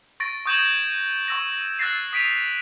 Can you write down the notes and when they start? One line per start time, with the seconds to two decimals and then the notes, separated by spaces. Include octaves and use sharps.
0.20 C#6 A6 A#6 D7
0.46 C#6 D#6 G6 G#6 E7 F#7
1.28 C#6 E6 A#6
1.79 E6 F#6 A6 A#6 C7
2.13 D#6 B6 D7 D#7 F7